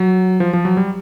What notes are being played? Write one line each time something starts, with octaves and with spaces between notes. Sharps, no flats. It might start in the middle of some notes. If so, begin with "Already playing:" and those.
Already playing: F#3
F3
F3
F#3
G3